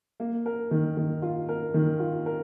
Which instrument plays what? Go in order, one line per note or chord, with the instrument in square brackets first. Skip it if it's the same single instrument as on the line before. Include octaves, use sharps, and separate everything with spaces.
[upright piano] A#3
A#4
D#3
D#3
F4
A#4
D#3
F4
A#4